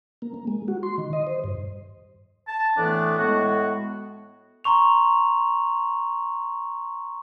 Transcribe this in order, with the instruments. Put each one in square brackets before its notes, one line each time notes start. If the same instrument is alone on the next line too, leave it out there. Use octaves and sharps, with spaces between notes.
[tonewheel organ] A#3
A#3
G#3
F#4
C6
D#3
D#5
C5
G2
[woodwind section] A5
A2 E3 A3 B3 D4
A2 G#3 B3 F#4
[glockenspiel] A#5 C6 C#6 F7